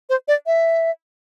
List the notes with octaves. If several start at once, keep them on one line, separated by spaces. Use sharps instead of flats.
C5
D5
E5